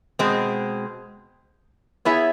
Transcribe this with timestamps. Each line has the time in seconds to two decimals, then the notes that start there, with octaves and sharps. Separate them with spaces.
0.19 B2 G#3 C4
2.05 B3 E4 G#4 C#5 E5